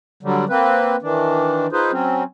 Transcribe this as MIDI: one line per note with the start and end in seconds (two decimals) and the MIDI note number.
0.23 0.45 50
0.23 0.45 54
0.23 0.45 55
0.49 0.96 58
0.49 0.96 60
0.49 0.96 71
1.02 1.67 51
1.02 1.67 52
1.02 1.67 62
1.72 1.91 63
1.72 1.91 65
1.72 1.91 68
1.72 1.91 71
1.72 1.91 72
1.92 2.23 54
1.92 2.23 60
1.92 2.23 61